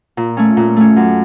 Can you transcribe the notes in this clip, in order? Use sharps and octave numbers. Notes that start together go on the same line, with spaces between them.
A#2
A3 C#4
A#2
A3 C#4
F#2